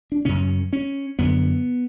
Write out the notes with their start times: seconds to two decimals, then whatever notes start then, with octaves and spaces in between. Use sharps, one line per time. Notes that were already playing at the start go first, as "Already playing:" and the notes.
0.12 D4
0.25 F#2 C#3 C#4
0.73 C#4
1.19 F#2 D3 B3